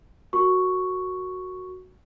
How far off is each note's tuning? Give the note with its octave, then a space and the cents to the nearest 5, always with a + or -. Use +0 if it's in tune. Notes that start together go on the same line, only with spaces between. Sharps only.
F#4 +0 A#4 +0 C#6 +0